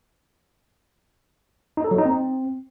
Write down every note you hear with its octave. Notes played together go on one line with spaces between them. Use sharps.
D#4
A4
F#3
D#4
C4